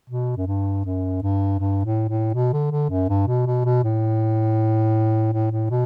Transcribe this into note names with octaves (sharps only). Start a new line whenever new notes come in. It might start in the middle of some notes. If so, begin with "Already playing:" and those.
B2
F#2
G2
F#2
G2
G2
A2
A2
B2
D3
D3
F#2
G2
B2
B2
B2
A2
A2
A2
B2